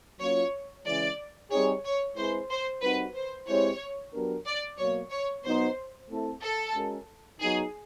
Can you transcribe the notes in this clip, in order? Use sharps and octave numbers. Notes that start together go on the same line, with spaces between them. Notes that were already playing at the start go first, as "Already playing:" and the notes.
F#3 A#3 C#4 F4 C#5
C#3 E3 G#3 D5
G3 C4 D#4 G#4 C#5
C#5
G#3 C4 E4 G#4 B4 C5
C5
G3 C4 D#4 F#4 A#4 B4
C5
G#3 C4 E4 G4 C5 C#5
F#3 B3 D4 G4 A#4
D5
B2 F#3 A#3 C#5
C#5
B2 F#3 B3 D#4 C5
A3 C4 E4 A4
A4
G#3 C#4 F#4 A#4
F#3 B3 D#4 G#4